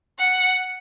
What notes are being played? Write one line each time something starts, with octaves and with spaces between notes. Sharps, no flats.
F#5